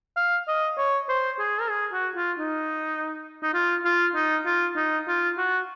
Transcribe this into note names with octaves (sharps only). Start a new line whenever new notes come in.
F5
D#5
C#5
C5
G#4
A#4
G#4
F#4
F4
D#4
D#4
F4
F4
D#4
F4
D#4
F4
F#4